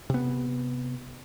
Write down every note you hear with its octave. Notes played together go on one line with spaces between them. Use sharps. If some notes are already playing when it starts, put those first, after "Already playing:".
C3 B3